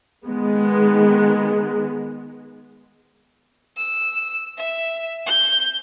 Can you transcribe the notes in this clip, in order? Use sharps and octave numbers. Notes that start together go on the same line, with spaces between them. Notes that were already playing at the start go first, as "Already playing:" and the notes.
D#3 G#3 B3
E6
E5
G6